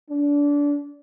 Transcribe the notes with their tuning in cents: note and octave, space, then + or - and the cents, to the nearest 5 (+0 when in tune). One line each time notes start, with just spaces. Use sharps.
D4 -25